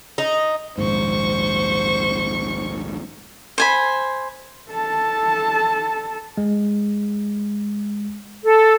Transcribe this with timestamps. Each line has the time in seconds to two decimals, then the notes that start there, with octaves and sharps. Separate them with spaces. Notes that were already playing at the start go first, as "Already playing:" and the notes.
0.18 D#4
0.78 A#1 D#2 G#2 C5 C#6
3.58 C5 G#5 B5
4.70 A4 A5
6.37 G#3
8.43 A4